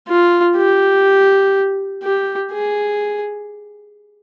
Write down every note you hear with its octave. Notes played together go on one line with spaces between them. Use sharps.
F4
G4
G4
G#4